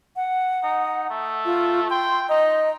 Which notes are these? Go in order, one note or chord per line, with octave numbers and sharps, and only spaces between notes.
F#5
D#4
A3
F4
G5 C6
D#4 D#5